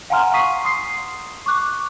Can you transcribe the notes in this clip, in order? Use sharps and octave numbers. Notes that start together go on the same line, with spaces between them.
F5 F#5 G#5 A#5 C6 F6
C#6 D#6 B6 C7 D#7
C6 D#6 C7
C#6 D6 F#6